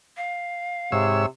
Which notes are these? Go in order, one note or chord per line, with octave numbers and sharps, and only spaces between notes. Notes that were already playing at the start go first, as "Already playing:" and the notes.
F5
G#2 C3 C#5 E6